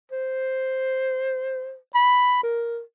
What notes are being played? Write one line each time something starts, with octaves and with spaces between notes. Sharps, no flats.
C5
B5
A#4